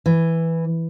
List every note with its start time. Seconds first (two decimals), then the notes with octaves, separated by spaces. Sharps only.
0.06 E3